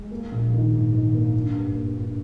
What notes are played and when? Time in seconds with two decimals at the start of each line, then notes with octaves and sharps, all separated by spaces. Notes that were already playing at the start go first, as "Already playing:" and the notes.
Already playing: G#3
0.11 A#3
0.32 A#1
0.53 D#3
0.73 G#2
0.93 D#3
1.14 A#3
1.34 D4
1.55 G2
1.75 A#3
1.96 D4